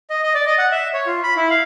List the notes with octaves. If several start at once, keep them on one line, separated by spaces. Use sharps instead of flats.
D#5
D#5
D5
D#5
F#5
E5
C#5
F4
B5
E4
F5